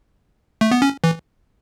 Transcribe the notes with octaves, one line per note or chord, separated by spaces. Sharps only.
A3
B3
C#4
E3